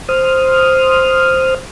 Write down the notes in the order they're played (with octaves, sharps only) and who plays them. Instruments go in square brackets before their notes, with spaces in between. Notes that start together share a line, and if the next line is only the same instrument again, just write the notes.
[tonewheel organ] C5 D#6 F6